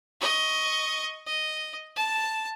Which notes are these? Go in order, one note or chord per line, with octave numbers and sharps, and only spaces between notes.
D#5 C#6
D#5
A5